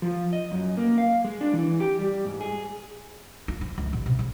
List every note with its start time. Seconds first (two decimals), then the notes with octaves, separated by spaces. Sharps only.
0.02 F3
0.33 D#5
0.52 F#2
0.77 A#3
0.98 F5
1.25 G#3
1.41 D4
1.53 E3
1.80 G4
1.99 G3
2.25 G#2
2.41 G#4
3.48 F4
3.61 F3
3.78 C#2
3.93 A1
4.06 C3
4.19 C#3